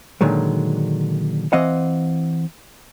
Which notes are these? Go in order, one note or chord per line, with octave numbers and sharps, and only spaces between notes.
A#2 D3 D#3 F#3 G#3
E3 C4 D#5 F5 F#5